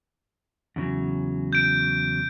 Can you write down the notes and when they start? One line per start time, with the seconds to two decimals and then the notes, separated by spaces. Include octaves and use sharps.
0.76 E2 C#3 F#3
1.53 G6 D7